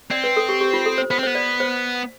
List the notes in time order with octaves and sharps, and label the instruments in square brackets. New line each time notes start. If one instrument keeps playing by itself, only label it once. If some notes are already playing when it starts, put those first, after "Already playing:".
[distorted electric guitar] C4 [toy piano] D5
[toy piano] B4
A4
G4
G4
F4
A4
C5
[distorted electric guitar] B3 [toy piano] C5
[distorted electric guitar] C4
[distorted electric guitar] B3 [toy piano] C5
[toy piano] D5
C5